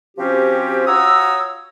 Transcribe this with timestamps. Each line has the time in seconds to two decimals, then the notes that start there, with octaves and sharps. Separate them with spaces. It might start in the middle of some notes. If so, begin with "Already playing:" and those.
0.18 F3 C4 C#4 F#4 G4
0.87 F4 F#4 C#5 A#5 D#6 E6